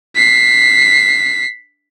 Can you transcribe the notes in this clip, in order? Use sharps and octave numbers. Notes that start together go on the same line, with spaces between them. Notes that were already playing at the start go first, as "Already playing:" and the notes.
B6 C7